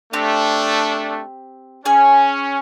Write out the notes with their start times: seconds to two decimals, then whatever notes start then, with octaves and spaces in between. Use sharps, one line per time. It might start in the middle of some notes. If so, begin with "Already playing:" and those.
0.13 A3 C4 D4 G4
1.85 C#4 G#4 G#5